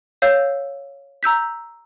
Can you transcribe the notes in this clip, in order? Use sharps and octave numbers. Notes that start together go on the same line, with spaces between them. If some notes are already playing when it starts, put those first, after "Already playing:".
C#5 F5 E6 G6
A#5 E6 G6 B6